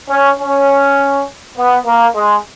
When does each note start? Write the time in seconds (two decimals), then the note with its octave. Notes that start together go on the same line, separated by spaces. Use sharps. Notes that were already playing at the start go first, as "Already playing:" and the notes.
0.10 C#4
0.40 C#4
1.57 B3
1.86 A#3
2.16 G#3